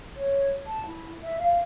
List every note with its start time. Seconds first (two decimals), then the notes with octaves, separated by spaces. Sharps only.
0.16 C#5
0.66 A5
0.86 E4
1.22 E5
1.39 F5